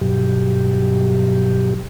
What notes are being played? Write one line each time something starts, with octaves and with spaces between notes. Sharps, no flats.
G2 B2 F#3 G4